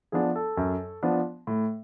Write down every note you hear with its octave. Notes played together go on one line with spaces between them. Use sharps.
F3 B3 D4 G#4
A4
F#2
F3 B3 D4
A2